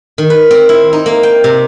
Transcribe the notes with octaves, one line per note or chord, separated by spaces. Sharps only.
D#3
B4
C4
E4
D#4
A#3
G5
C3